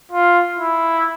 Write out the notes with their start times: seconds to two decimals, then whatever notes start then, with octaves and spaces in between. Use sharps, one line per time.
0.12 F4
0.59 E4